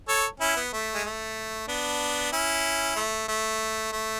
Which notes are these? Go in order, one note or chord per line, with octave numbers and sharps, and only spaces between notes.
A4 C#5
C#4 E4
B3
A3
G#3
A3
B3 D4
C#4 E4
A3
A3
A3